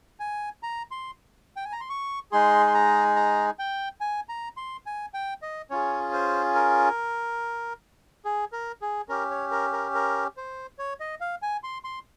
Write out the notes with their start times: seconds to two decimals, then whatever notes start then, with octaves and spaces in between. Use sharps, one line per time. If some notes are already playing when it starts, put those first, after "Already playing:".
0.20 G#5
0.63 A#5
0.91 C6
1.56 G5
1.65 G#5
1.73 A#5
1.81 C6
1.90 C#6
2.32 G#3 D#4 G#4 C6
2.67 C6
2.75 A#5
3.16 A#5
3.59 G5
4.01 G#5
4.29 A#5
4.57 C6
4.86 G#5
5.14 G5
5.42 D#5
5.70 C#4 F4 G#4 C#5
6.13 C5
6.55 A#4
8.25 G#4
8.52 A#4
8.82 G#4
9.09 C#4 G4 A#4
9.31 C#5
9.51 A#4
9.73 A#4
9.94 A#4
10.37 C5
10.79 C#5
11.00 D#5
11.21 F5
11.42 G#5
11.63 C6
11.84 C6